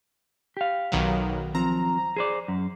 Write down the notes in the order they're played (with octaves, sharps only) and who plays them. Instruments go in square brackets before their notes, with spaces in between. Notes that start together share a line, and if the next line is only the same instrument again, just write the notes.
[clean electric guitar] G4 F5
[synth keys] B1 D#3 F#3
[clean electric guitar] F3 C4 [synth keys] A#5
[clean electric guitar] G#4 C5 D5
F#2